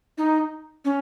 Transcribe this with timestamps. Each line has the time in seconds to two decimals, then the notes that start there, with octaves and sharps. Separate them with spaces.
0.18 D#4
0.85 C#4